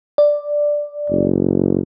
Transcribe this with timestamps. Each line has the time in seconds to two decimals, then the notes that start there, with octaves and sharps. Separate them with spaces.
0.18 D5
1.10 F#1